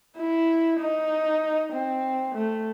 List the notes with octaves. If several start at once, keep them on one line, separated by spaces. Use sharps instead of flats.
E4
D#4
C4
A3